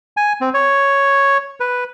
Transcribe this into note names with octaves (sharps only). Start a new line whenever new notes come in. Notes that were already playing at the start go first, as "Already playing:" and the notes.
G#5
C4
C#5
B4